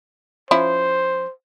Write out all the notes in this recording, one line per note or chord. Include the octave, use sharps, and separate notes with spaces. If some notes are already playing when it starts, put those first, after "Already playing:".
F3 C#4 E4 C5